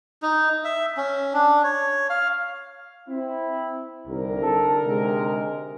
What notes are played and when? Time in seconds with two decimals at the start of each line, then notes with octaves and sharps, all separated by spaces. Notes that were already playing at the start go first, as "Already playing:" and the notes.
0.22 D#4
0.65 E5
0.97 C#4
1.34 D4
1.64 C#5
2.10 F5
3.09 C4 E4
4.07 C2 D3 D#4 A#4
4.41 A4
4.85 C3 G#3